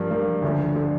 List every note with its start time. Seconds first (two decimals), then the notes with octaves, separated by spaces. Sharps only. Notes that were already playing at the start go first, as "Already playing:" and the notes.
Already playing: G2 F3 A#3
0.11 G2 F3 A#3
0.42 D2 D3 F3
0.75 D3 F3